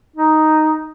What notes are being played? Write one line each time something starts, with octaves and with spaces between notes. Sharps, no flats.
D#4